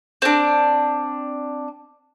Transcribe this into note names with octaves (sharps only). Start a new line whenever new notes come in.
C4 D4